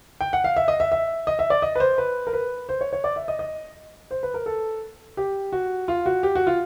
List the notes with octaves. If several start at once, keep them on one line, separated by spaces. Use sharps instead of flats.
G5
F#5
F5
E5
D#5
E5
E5
D#5
E5
D5
D#5
B4
C5
B4
A#4
B4
C5
C#5
C#5
D5
E5
D#5
D#5
C5
B4
A#4
A4
G4
F#4
F4
F#4
G4
F#4
F4